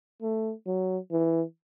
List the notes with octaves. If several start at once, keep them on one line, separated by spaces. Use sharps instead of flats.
A3
F#3
E3